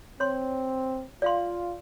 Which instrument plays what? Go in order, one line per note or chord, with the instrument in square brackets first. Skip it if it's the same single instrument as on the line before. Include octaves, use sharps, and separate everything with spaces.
[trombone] C4 [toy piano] C#5 C6
[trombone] F4 [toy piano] D5 F5 C6